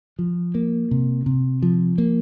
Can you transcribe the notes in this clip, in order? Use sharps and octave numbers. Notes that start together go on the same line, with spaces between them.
F3
A#3
C3
C3
F3
A#3